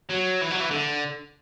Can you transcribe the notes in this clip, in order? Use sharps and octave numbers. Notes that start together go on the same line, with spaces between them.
F#3
E3
F#3
E3
D3